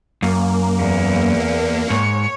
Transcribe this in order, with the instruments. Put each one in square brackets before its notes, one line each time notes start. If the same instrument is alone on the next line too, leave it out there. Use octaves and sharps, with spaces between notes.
[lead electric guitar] F#2 [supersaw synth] A#3
[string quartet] E2
[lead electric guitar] G#2 [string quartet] C#5